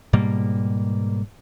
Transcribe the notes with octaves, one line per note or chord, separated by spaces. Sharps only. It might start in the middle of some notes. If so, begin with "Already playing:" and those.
G#2 B2 G3 A#3